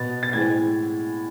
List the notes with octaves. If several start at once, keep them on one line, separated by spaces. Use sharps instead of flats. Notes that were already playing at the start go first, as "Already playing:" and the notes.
Already playing: B2 B3 A6
A6
A2 E3 G#3 C4 G#6